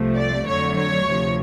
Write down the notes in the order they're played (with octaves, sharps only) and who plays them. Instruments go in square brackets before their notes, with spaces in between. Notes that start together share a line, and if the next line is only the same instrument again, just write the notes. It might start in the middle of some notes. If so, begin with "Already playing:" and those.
Already playing: [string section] C2 C3 F3 A3
D5
F2 D3 F#3 A3 C#5
C#5
D2 C3 F3